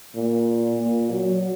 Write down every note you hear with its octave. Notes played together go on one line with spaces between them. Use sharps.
A#2
A#2
F#3